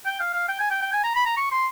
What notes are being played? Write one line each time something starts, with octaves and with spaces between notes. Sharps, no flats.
G5
F5
F5
G5
G#5
G5
G5
G#5
A#5
B5
A#5
C#6
C6